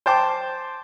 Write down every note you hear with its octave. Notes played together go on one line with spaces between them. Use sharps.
C5 G5 A5 D6